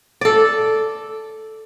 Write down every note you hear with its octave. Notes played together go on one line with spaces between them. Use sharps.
A4 D5